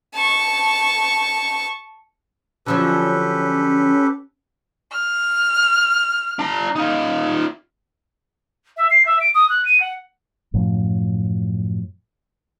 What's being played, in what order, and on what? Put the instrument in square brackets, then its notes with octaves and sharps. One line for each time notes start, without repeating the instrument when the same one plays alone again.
[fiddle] A5 C#6
[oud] D3 F3 F#3 [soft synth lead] C#4 [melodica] G4 A4 B4
[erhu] F6
[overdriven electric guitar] D4 A#5
D#4 F4
[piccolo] E5
C7
E5
D7
D#6
F#6
D#7
F#5
[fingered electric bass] F#2 A2 F3